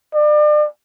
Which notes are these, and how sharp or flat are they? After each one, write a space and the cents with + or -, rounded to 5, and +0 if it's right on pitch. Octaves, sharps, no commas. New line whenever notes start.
D5 +35